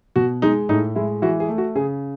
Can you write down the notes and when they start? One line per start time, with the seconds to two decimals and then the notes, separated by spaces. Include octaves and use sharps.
0.16 B2 F#4
0.42 G#3 D#4
0.69 A2 D#4
0.95 G#3 E4
1.22 E3 F#4
1.40 G#4
1.49 A3
1.58 F#4
1.76 C#3 G#4